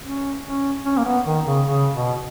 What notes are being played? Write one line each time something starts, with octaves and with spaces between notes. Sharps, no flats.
C#4
C#4
C#4
A#3
B3
D#3
C#3
C#3
B2